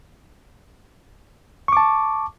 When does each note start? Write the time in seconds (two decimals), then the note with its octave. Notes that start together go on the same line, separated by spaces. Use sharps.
1.68 C#6
1.72 D6
1.77 A5